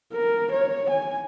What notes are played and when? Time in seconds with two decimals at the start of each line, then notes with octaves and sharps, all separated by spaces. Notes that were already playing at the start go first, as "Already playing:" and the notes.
0.13 A#4
0.52 C#5
0.90 G#5